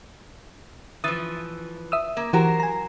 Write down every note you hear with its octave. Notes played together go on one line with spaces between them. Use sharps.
E3 F3 D#6 A6
E5 D#6 E6
A#3
E3 F#3 F#4 G4 A#4 C5
G#5 A#5